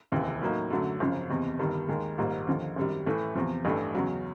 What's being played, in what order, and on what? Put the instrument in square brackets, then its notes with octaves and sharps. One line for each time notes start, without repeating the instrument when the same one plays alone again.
[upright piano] F1 D#2 C#3 E3
A2 F#3 A#3 D#4
F#2 D3 F#3 A3
G#1 F#2 C#3 F3
F#1 E2 C3
G1 G2 D#3 G3
D#2 D#3 G#3
A#1 G#2 D#3 G3 A#3
D#2 D3 F3
G#1 F#2 D#3 G3
A2 E3 A3
E2 C3 F3
A1 G2 E3 A3 D4
E2 C#3 F#3